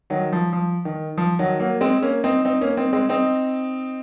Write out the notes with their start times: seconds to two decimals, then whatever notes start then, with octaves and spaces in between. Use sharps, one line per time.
0.10 D#3 F#3
0.33 F3
0.53 F3
0.85 D#3
1.17 F3
1.39 D#3 F#3
1.59 F#3 A#3
1.81 G#3 C4
2.02 A#3 C#4
2.24 C4 D#4
2.45 C4 D#4
2.61 A#3 C#4
2.77 C4 D#4
2.93 G#3 C4
3.09 C4 D#4